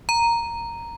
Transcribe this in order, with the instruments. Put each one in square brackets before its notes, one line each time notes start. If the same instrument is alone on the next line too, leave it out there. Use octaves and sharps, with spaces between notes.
[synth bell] A#5